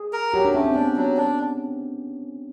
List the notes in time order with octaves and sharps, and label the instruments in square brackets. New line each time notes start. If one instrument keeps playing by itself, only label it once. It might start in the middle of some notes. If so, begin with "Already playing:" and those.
Already playing: [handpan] G#4
[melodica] A#4
[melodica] F#3 [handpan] G4
[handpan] D4
[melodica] A3 [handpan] C#4
[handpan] C4
[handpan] B3 [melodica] D4
[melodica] F#3
D4